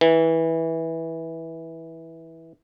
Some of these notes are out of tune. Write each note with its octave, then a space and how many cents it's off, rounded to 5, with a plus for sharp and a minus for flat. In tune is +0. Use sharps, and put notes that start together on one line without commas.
E3 -15